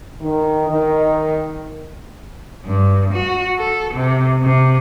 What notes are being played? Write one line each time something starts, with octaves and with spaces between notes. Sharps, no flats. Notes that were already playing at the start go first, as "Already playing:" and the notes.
D#3
D#3
G2
F#4
A4
C3
C3